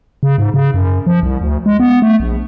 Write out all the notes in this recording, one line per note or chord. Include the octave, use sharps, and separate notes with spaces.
C#3
G#2
C#3
F#2
F3
C2
D2
G#3
B3
A3
A#1